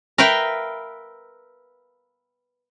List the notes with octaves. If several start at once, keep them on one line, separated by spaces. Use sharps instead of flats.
A#4 B4 E5 F5 G5